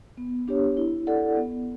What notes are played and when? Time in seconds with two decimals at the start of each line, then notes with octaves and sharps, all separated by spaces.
0.17 B3
0.48 D4 G4 C#5
0.77 E4
1.07 A4 D5 F#5
1.36 B3